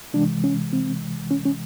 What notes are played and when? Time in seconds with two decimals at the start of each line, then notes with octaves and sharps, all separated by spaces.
0.13 C3 E3 G#3 D4
0.44 C#4
0.73 C4
1.31 C#4
1.45 C#4